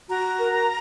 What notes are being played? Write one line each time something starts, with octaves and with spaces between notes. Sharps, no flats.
F#4 A#5
A#4